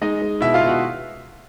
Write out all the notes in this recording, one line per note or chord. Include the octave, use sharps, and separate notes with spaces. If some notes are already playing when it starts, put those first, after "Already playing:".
G#3 D#4 D#5
G#3
B2 E4 E5
F4 F5
B2
F#4 F#5